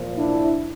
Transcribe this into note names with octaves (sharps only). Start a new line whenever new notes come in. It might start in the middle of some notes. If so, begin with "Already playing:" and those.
Already playing: A#2 F3
D4 E4